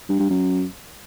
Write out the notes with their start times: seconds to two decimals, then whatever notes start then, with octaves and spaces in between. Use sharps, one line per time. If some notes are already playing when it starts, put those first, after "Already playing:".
0.09 G2
0.19 G2
0.29 F#2